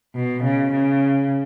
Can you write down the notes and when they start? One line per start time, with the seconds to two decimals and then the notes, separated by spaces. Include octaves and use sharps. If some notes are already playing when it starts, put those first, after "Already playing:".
0.16 B2
0.44 C#3
0.72 C#3